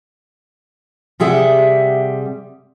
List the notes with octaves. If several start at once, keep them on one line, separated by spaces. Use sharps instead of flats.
C3 G3 G#4 E5 F#5